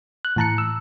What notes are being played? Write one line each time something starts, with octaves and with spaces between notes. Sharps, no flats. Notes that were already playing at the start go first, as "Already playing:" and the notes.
F#6
A2 E3 A5 A#5 F#6 C#7
E6